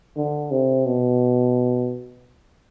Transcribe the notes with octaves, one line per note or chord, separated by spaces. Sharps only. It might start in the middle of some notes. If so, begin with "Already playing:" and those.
D3
C3
B2